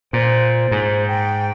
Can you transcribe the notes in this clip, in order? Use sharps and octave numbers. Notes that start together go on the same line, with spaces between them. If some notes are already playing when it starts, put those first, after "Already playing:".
A#2 C5
G#2
G5